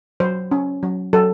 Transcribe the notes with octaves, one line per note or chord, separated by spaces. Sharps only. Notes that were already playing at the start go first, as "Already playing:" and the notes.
F#3 C5
C#4
F#3
F#3 A4